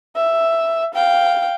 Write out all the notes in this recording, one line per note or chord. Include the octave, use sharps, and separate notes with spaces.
E5
F5 G5